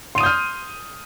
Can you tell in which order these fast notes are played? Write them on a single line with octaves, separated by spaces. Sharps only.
C6 D#7 D#6 G6 F6